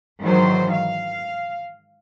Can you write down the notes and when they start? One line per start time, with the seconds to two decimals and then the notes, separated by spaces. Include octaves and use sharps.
0.21 G#2 D#3 E3 F#3 C5
0.72 F5